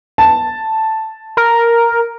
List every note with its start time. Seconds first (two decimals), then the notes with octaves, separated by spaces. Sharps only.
0.18 A5
1.37 A#4